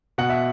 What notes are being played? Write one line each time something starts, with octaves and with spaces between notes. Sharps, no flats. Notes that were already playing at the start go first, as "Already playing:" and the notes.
B2 F#5
E5